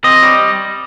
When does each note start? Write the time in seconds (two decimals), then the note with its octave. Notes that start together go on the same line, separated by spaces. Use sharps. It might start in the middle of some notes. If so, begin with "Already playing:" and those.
0.04 C4 D#5
0.23 G3